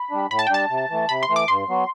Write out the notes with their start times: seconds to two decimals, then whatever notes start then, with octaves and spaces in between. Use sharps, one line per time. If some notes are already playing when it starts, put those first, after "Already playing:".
Already playing: B5
0.11 G3 D4
0.30 A2 B5
0.39 A5
0.47 G5
0.50 G3 D4 A5
0.70 C3
0.90 E3 A3
1.09 C3 B5
1.23 C6
1.29 E3 A3
1.36 D6
1.48 G2 C6
1.69 F#3 B3 F#4